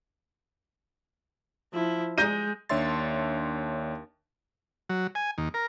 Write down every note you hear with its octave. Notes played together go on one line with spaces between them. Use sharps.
F3 E4
G#3 G6 A#6 D#7
D#2 D4 C#5 E5 C6 A6
F#3
G#5
D#2
A#4